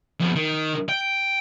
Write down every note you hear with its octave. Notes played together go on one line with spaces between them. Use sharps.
F2 B3
D#3
G5